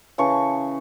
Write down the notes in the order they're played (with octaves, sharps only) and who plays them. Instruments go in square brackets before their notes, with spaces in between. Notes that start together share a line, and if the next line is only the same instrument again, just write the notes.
[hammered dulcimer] C#3 E3 A5 C#6